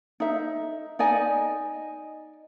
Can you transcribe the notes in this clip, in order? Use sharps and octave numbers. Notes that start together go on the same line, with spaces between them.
D#4 E5
D#4 D5 D#5 G#5